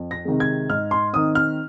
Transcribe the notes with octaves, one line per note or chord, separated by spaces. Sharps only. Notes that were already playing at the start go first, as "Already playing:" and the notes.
Already playing: F2
A#6
C3 D#3 G#3
G#6
G#2 F6
C6
D#3 C4 D#4 D#6
F6